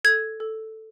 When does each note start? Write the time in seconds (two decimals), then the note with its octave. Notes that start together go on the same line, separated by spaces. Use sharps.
0.04 A4 G#6
0.40 A4